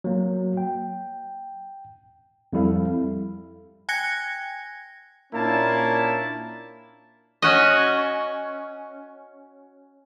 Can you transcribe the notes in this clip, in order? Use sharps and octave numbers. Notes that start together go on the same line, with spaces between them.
F#3 A#3
G5
F2 G3 E4 A4 F5
G5 G#5 F#6 G#6 A#6 C#7
A#2 A#3 C#4 D4 E4 A5
C#4 F#4 D#5